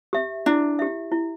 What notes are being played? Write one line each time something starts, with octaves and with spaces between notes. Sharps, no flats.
G4 E5
D4 E4
G4 E5
E4